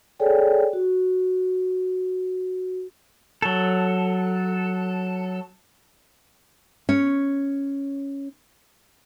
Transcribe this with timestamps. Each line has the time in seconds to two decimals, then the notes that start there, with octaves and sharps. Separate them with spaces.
0.20 G#4 A4 C#5 D5 G5 G#5
0.73 F#4
3.42 F#3 A4
6.89 C#4 C#5